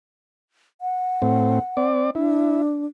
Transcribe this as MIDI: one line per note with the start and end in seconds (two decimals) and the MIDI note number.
0.81 1.86 78
1.22 1.59 45
1.22 1.59 60
1.77 2.10 60
1.77 2.10 74
2.15 2.85 62
2.15 2.61 64